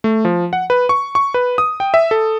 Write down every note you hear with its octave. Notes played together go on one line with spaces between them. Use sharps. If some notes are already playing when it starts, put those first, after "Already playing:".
A3
F3
F#5
B4
C#6
C#6
B4
D#6
G5
E5
A4